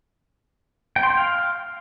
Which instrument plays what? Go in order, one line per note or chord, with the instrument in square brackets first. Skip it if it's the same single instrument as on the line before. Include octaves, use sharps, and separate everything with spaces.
[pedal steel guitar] G5
C6
G5
F5